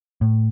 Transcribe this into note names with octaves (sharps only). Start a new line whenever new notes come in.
A2